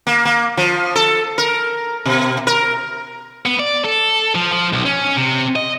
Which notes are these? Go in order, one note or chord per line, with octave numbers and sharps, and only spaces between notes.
A#3
A#3
F3
A4
A#4
B2
A#4
B3
D5
A4
F3
F3
B1
C#4
C3
D#5